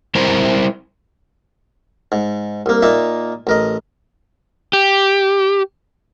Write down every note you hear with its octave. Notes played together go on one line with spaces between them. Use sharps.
G3 C4 E4 A#4 C5 A#5
G#2
C2 A#3
A#2 A#3 D#4 E5
A1 A#4 D#5
G4